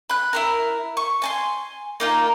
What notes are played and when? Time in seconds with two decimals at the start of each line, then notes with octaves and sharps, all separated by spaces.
0.10 B5 F#6
0.33 E4 G4 A#4
0.97 C#6
1.22 G#5 A5 C6
2.00 A#3 D#4 F4